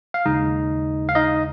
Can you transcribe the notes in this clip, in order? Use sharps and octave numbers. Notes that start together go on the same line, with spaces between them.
F5
D#2 C#3 G#3 D#4 D#5
F5
D#4 D#5